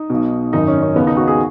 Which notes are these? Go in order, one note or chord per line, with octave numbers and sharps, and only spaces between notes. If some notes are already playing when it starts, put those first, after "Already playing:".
Already playing: D#4
B1 B2
G#1 F#2 D#3 D#4
C#4
C#4
D#2 C#3 B3
D#4
F#4
G#4